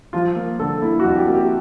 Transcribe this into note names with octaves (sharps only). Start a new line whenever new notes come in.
F3 F4
A#3
D3 A4
A#3 E4
F#4
F2
G4
A#3
G4